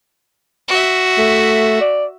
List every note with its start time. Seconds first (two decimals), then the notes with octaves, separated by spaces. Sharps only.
0.68 F#4 E5
1.18 A3
1.81 D5